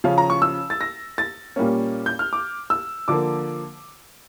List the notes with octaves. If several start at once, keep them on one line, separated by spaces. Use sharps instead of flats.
C#3 F3 C#4 F5
A#5
C#6
E6
A6
A#6
A6
A#2 G3 A#3 C#4
G6
F6
D6
E6
D3 F3 A#3 D6